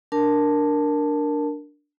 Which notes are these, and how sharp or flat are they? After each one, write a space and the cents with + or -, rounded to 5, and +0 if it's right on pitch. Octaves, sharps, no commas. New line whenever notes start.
D4 +0 A#4 +0 A5 +0